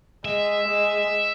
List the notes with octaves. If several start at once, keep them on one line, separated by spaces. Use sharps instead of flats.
G#3 E5
G#3